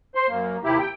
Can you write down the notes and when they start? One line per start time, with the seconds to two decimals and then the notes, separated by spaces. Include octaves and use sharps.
0.15 C5 C6
0.29 F#2 A#3
0.64 D#2 C3 E4 G4
0.79 G5